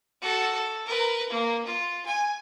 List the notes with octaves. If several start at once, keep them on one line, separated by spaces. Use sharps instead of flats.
F#4 A4
A4
A#4 B4
A#3
F4
G#5